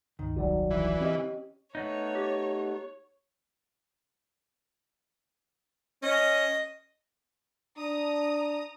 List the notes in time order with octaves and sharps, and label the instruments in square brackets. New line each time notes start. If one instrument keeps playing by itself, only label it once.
[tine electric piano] C#2 G2 [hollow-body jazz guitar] D#3
[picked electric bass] D#1 C2 F#3 [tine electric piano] F#4 D5
[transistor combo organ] E3
[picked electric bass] C4 [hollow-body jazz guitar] C#4 G4 D#5
[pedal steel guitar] A3 B3 D#4 [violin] C#5
[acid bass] G4
[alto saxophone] C#4 [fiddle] D#5
[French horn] D4 [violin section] A#5 D#6